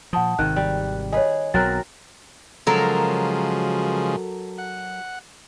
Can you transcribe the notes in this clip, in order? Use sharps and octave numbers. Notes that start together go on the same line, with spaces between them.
A#2 F3 F#5 A5 D#6
G#1 C3 D#3 F#6
G3
G#4 B4 C#5 D#5
B1 F#3 C4 A#4 F#6 A6
C#3 F3 F#3 G#3 A4 A#4
F#5